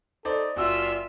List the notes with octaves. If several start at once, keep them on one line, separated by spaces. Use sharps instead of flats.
D#4 A4 C5 D5
F#1 F4 F#4 D5 E5 E6